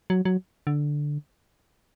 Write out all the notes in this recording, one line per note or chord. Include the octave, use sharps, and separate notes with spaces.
F#3
F#3
D3